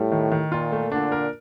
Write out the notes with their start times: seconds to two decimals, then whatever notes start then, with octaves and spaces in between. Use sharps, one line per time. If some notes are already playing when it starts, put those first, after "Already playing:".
Already playing: A2 G3
0.12 D#3
0.32 D#3
0.51 A#2 F4
0.72 A3
0.91 A#2 D3 D4
1.12 A#4